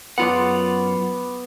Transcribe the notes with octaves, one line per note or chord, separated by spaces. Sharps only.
F#2 B3 F4 F#5 D6